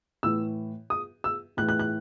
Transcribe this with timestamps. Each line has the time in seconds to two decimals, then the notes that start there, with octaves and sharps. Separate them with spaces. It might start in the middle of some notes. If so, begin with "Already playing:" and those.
0.23 A2 E3 E6
0.90 D#6
1.24 E6
1.57 A2 F#6
1.61 E3
1.69 F#6
1.79 F#6